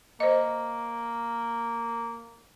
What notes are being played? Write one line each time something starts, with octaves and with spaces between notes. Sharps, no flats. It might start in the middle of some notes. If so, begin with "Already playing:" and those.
A#3 C5 D#5